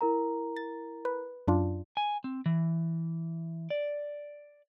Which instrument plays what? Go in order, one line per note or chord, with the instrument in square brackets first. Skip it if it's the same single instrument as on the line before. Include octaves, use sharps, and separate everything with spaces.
[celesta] E4 A#4 A#5
[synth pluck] A6
B4
F#2 D4 F4
[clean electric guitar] G#5
C4
E3
D5